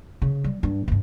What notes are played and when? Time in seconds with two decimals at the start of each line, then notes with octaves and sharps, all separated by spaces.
0.22 C#3
0.44 G3
0.63 G2
0.88 G2 E3